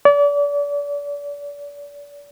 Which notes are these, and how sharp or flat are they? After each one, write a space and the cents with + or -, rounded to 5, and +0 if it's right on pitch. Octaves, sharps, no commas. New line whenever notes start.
D5 -35